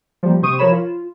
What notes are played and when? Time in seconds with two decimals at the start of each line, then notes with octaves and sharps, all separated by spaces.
0.23 F3 G3 A#3
0.42 C3 C5 C#6 D#6 D#7
0.58 F3 A#4 C#5 B5 E7
0.72 F4